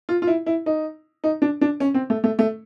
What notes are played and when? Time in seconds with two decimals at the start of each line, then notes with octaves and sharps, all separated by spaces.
0.09 F4
0.22 F4
0.27 E4
0.46 E4
0.66 D#4
1.24 D#4
1.42 D4
1.61 D4
1.80 C#4
1.94 C4
2.10 A3
2.24 A3
2.39 A3